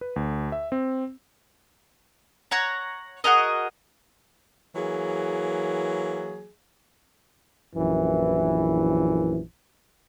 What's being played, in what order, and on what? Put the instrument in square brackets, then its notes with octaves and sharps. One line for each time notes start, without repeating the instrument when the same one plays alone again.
[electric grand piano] B4
D2
E5
C4
[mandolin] C#5 F#5 A#5
F#4 G#4 A#4 D#5
[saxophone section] E3 F#3 A#3 G#4
[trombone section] A#1 F#2 E3